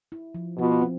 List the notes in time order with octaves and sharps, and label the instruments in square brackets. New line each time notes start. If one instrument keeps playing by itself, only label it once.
[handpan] E4
F3
[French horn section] B2 B3 F4 [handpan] F3
[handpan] C4